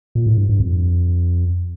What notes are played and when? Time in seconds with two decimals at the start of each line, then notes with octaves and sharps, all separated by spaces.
0.15 A#2
0.27 A2
0.38 G2
0.49 G2
0.60 F2